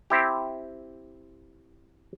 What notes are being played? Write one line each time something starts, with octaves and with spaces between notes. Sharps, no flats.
C4 E4 G4